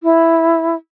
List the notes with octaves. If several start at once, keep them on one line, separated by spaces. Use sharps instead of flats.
E4